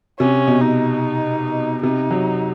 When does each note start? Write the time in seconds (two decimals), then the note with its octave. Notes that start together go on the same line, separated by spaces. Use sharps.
0.20 C3 C#4
0.47 B2
0.61 D#4
1.83 C3 D#4
2.11 F#3